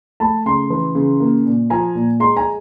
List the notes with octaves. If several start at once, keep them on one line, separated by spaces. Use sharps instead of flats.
A3 A5 B5
C#3 A#5 C6
E3
C#3
A#3
A#2
F3 G#5 A#5
A#2
G#3 A#5 C6
G#5 A#5